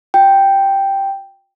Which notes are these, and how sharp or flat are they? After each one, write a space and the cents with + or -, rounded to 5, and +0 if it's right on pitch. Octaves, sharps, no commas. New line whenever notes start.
F#4 -45 G5 +0